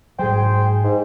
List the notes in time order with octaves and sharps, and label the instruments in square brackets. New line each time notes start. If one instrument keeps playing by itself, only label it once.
[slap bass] G#2 F#3 [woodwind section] G#4 C5 G5
[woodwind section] G#2